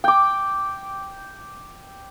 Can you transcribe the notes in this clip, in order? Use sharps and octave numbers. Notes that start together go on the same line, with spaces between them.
G5 D6